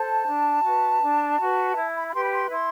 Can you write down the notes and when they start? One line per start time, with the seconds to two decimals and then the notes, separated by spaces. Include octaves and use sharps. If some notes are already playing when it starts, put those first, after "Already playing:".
Already playing: A4 C5 A5
0.27 D4
0.65 F#4 B4
1.02 D4
1.39 F#4 B4
1.76 E4
1.95 B5
2.08 B5
2.14 G4 B4 C6
2.24 B5
2.32 C6
2.51 E4 C6